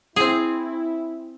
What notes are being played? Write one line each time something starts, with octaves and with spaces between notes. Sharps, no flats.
C4 E4 G#4